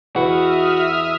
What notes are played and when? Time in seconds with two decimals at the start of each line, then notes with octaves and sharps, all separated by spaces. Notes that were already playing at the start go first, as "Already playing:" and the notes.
0.16 E2 B2 E4 F#4 E5 D#6 F6